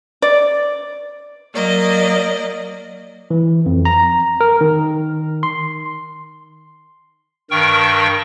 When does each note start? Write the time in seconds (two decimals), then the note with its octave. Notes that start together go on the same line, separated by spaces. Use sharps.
0.22 D5
1.53 F#3 A#3 D5 D#5
3.31 E3
3.66 F2
3.85 A#5
4.41 A#4
4.61 D#3
5.43 C6
7.51 G2 D#3 A#4 G5 C#6